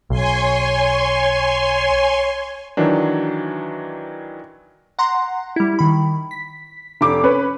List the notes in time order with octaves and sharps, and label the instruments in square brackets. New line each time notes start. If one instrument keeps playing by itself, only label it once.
[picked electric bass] B1 [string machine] C#5 G#5 C6
[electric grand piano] D#3 E3 F#3 D4
[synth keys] F#5 A#5 C6
G3 E4
D#3 B5
B6
[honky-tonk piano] F1 D6
C#4 B4